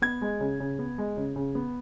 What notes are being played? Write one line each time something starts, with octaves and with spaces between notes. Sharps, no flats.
B3 G#6
G#3
C#3
C#3
B3
G#3
C#3
C#3
B3